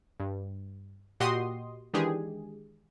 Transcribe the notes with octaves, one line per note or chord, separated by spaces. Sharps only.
G2
A#2 F#4 G4 D#5 C6 D#6
D#3 E3 G#3 D4 G4 G#4